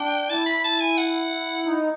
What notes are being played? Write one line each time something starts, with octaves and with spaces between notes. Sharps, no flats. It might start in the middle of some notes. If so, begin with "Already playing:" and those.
Already playing: D4 G5
E4 A5
B5
A5
G#5
F#5
D#4